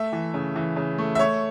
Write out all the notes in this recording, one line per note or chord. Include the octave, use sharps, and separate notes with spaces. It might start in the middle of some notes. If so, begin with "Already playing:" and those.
Already playing: A3 E5
E3
C#3
E3
C#3
A3
E5
A3 C#5